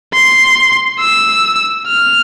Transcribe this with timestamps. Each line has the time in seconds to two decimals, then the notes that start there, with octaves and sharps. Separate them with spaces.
0.14 C6
0.99 E6
1.87 F6